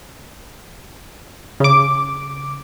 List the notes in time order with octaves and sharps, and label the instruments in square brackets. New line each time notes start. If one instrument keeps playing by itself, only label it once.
[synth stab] C#3 D6